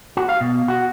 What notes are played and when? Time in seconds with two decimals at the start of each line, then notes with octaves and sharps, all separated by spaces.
0.17 F#4
0.29 F5
0.41 B2
0.68 F#4